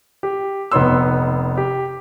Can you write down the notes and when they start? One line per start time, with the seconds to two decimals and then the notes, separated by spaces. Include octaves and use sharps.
0.23 G4
0.72 F1 B3 D#4 C#5 C6 E6
1.57 G4